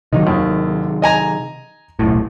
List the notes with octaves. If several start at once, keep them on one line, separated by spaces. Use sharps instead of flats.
C3 D#3 F#3 D#4
D#2
D#5 G#5 A#5
D#1 B1 A2